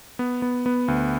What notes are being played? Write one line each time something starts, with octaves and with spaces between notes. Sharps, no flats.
B3
B3
B3
D2